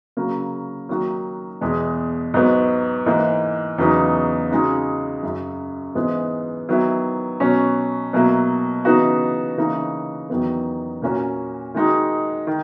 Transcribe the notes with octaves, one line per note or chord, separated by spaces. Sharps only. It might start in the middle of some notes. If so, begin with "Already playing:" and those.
C#3 F#3 A#3
D#3 F#3 A#3 D#4 F#4
E2 B2 G#3
G#2 F#3 B3
G#2 E3 A#3
E2 C#3 F#3 B3 D#4
C#3 G#3 D#4 F#4
F#2 C#3 F#3
G#2 E3 G#3 B3
D#3 F#3 B3 E4
B2 F#3 C#4
B2 F#3 A#3 E4
C#3 E3 B3 D#4 F#4
C#3 E3 A#3 D#4
E2 D#3 F#3 B3
A#2 A#3 C#4 F#4
D#3 G#3 D#4 F#4
D#3